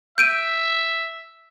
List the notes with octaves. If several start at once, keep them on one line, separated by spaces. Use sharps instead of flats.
E5 G6 D7 D#7